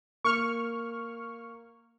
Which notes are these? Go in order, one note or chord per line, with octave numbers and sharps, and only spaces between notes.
A#3 C#6 F6